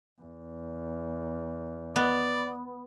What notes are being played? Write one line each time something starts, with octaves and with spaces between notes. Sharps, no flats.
E2
B3 D5